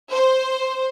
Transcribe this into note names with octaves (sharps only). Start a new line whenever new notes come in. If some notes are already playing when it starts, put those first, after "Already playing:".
C5